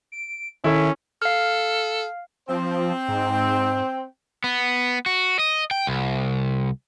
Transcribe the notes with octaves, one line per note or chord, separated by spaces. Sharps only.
D7
D#3 C#4 E4 A4 E5
A4 F5 F6
F3 C4 C5 G5
G#2
B3
F#4
D#5
G5
C2